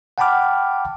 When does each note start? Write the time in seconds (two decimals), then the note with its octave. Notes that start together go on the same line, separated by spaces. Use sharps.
0.18 F#5 G5 A5 B5 D6 F6